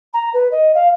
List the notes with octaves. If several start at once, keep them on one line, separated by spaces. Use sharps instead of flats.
A#5
B4
D#5
F5